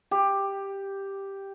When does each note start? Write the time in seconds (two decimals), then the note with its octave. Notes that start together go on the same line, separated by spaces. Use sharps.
0.11 G4